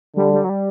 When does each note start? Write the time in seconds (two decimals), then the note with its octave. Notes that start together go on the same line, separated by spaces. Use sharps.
0.16 D3 G3
0.33 G3
0.44 F#3
0.49 G3